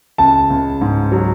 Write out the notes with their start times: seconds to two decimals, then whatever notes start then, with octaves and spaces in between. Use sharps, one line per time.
0.18 C#2 A5
0.50 C#2
0.81 G#2
1.12 F#3